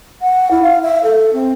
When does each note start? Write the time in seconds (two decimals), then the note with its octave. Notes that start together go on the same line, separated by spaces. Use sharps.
0.22 F#5
0.51 E4
0.63 F5
0.83 E5
1.03 A4
1.33 C4